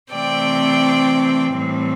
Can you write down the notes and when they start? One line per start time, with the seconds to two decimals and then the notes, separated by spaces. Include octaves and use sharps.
0.12 C3 E3 A3 C4 D5 G5
1.58 A2 E3 G3 C4